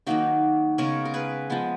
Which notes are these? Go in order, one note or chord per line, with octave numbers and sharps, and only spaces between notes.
D#3 F#3 A#3 D#4 F#4
C#3 G#3 B3 A#4 C#5
A#4
G#4 B4
F3 G#3 B3